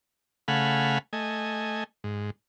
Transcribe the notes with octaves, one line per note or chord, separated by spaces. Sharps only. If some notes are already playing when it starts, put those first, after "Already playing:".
C#3 A3 F5 F#5 G#5 B5
A3 D#5 G#5
G#2